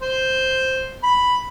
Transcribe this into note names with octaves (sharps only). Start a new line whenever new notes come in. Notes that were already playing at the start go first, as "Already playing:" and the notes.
C5
B5